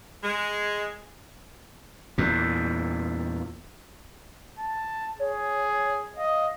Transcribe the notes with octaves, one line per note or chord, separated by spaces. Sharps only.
G#3
E2 A#2
A5
G#4 C#5
D#5 F5